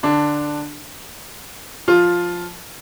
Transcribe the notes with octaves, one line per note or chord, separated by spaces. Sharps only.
D3 D4
F3 F4